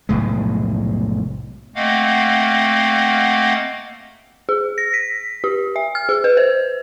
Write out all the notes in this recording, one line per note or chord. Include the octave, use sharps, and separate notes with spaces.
F1 B1 A2 G#3
A3 A#3 C4 D#5 F5 F#5
G#4
A#6
B6
G4
E5
F6
G#4
B4
C5